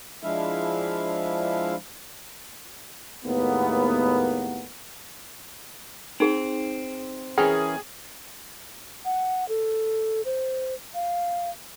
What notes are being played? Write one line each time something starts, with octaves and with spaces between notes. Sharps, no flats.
F3 G#3 D4 E4 E5 F5
D#2 A2 G#3 A#3 B3
C4 D#4 G#4
E3 C#4 G#4 A#4 G5
F#5
A4
C5
F5